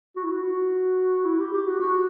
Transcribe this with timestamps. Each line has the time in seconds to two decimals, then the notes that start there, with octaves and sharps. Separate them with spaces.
0.16 F#4
0.24 E4
0.31 F#4
1.25 E4
1.39 G4
1.53 G4
1.67 F#4
1.79 F#4